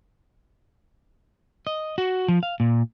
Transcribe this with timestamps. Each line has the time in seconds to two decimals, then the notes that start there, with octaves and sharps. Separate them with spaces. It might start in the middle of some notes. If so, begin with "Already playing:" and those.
1.67 D#5
1.98 F#4
2.28 F3
2.43 F5
2.60 A#2